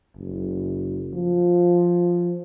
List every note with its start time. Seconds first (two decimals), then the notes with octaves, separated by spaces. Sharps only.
0.17 F#1
1.14 F3